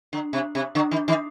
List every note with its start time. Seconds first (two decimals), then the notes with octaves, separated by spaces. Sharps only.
0.13 D3
0.33 C3
0.55 C3
0.75 D3
0.91 D#3
1.08 D#3